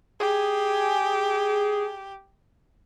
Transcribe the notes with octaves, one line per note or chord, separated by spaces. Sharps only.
G4 G#4